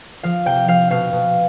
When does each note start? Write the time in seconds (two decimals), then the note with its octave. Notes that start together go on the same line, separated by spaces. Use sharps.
0.23 F3 F5
0.46 C3 G5
0.68 F3 F5
0.90 B2 F5
1.13 B2